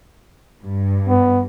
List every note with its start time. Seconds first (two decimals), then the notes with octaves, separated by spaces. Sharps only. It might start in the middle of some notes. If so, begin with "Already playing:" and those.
0.62 G2
1.09 B3